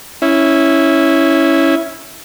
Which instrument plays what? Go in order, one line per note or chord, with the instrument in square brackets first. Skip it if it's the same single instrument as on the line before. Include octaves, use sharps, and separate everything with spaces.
[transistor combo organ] C#4 E4